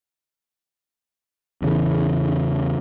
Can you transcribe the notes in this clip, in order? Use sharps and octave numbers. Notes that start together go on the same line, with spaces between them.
E2 C#3 E3